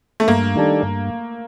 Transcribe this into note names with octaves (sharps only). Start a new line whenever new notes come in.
A3
G2 A#3
D#3 G3 D4 A4
G2